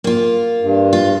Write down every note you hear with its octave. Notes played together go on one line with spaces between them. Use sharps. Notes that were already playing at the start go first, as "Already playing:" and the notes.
A#3 F4
G2
F4